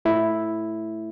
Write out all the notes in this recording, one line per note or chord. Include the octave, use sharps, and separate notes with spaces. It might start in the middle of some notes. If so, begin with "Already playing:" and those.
A3 E4